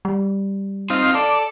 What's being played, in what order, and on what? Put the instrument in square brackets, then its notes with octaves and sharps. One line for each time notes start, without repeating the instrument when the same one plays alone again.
[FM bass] G3
[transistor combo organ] C4 D#4 F5 [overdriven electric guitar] F4
[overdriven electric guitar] A4 [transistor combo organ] D5